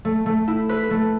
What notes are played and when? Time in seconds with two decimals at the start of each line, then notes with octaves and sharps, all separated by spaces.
0.05 A3
0.26 A3
0.48 E4
0.69 B4
0.91 A3